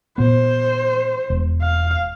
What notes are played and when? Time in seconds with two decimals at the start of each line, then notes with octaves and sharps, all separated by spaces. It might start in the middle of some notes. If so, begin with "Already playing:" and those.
0.18 A#2 B3 C5
1.30 E1
1.62 F5